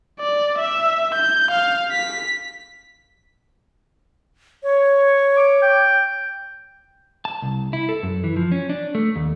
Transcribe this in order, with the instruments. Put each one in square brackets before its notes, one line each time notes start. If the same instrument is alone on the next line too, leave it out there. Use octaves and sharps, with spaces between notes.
[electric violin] D5
E5
G6
F5
B6
[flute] C#5
[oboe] D6
G5
[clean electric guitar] A5
C2
E4
A4
F#2
E3
F3
C#4
D4
A3
D#2